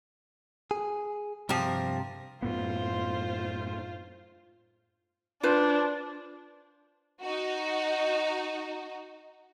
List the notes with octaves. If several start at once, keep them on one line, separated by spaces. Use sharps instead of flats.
G#4
G2 C3 F3 G4 A#4
F#2 A2 B3 F4 C5
D4 F4 B4 C5
D#4 F#4